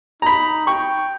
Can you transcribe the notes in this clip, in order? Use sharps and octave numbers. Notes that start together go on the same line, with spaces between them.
D#4 A#5 B5
G5 C#6